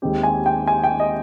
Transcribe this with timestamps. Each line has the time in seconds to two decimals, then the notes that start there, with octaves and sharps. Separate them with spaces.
0.02 D#2 D#3 G#3 C4 G4
0.23 G#5
0.46 G5
0.68 G#5
0.84 G5
1.00 D#5